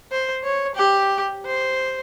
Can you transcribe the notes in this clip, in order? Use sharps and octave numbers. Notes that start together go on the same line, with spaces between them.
C5
C#5
G4
C5